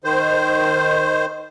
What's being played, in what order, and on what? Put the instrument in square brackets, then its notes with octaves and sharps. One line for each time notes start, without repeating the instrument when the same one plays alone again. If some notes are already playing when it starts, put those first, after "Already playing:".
[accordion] D#3 C5